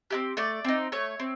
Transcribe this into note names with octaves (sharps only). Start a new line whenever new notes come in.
C4 E4 G4
A3 D5
C4 D#4
A3 C#5
C4